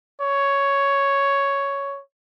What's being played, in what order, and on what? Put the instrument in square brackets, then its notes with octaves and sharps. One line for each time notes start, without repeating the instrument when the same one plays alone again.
[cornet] C#5